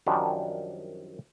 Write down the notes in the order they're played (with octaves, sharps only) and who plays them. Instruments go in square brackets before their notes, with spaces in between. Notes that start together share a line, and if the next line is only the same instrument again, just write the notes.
[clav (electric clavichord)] F#2 D#3 F3 G3 D4 F#4